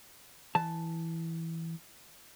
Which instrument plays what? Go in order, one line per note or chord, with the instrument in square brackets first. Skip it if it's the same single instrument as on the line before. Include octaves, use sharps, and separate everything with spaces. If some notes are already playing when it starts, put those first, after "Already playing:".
[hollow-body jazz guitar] E3 A5